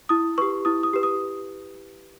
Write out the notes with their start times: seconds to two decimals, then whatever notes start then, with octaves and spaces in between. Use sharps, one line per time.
0.09 E4 D#6
0.38 G4 B4 C#6
0.65 E4 D#6
0.83 D#6
0.93 G4 B4
1.03 D#6